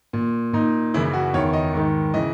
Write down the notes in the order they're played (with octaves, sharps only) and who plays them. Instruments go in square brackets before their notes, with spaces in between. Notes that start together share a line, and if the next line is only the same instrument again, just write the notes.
[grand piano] A#2
A#2 D#4
F#2 C#3 E3 E4
F#4
E2 D#3 C#5
D#5
G#2 D#3
C#3 E3 D#5